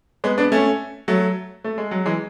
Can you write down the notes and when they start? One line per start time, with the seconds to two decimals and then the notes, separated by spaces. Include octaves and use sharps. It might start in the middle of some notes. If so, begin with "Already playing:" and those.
0.24 G#3 B3
0.38 B3 D4
0.52 A3 C#4
1.08 F#3 A3
1.64 A3
1.78 G#3
1.91 F#3
2.06 E3 G#3